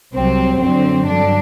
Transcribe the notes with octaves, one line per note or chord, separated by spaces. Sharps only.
C2 C3 F#3 C4
F#2 D3 F#3 C4
G2 D3 F#3 D4